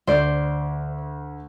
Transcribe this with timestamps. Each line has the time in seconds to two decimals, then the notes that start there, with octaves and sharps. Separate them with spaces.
0.07 D2 C5 D5